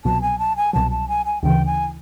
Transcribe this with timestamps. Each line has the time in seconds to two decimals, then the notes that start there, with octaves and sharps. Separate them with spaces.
0.05 C2 B2 F#3 A5
0.22 G#5
0.39 A5
0.57 G#5
0.73 C2 B2 F#3 A5
0.91 A5
1.08 G#5
1.26 G#5
1.43 D2 C#3 E3 G5
1.66 G#5